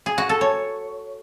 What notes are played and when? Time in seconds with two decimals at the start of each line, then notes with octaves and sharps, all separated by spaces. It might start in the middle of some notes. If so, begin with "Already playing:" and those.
0.06 G#4
0.18 F#4
0.29 A4
0.41 C#5